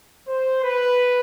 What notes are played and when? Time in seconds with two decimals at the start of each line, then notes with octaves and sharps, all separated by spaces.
0.28 C5
0.63 B4